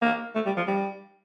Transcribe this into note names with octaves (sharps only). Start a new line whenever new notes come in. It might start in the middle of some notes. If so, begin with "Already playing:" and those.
A#3
A3
G3
F3
G3